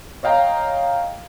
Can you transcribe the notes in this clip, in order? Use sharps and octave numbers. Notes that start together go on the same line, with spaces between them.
C#5 D#5 F5 G5 A#5